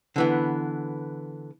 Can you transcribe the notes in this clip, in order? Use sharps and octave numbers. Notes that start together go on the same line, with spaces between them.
D3 E3 B3